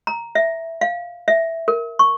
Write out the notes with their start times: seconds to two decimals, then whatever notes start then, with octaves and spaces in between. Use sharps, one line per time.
0.07 A#5
0.35 E5
0.81 F5
1.28 E5
1.68 A#4
1.99 C#6